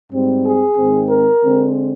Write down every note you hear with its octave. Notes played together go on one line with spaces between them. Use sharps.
G#2 G3 C4
G#4
G#2 D#3 G#3 C4
A#4
D3 G#3 C4